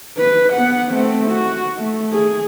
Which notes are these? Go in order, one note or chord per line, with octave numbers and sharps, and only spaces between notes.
B4
B3 F#5
A3 C4
F#4
A3
G#4